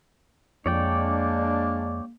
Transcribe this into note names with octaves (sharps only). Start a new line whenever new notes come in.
F2 G#3 A#3 D4 C#5 D5 G5